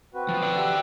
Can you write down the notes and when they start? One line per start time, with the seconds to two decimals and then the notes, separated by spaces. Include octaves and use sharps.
0.14 C4 F#4 B4
0.29 F3
0.42 D5 F#5
0.57 G4 E5 F#6